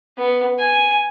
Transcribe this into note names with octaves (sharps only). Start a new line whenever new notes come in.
B3
G#5